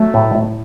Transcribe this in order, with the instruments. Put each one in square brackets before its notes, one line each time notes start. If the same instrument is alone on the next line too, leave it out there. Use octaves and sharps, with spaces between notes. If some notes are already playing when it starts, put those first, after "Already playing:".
Already playing: [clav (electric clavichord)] F#3 [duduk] A3
[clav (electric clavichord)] A2
A2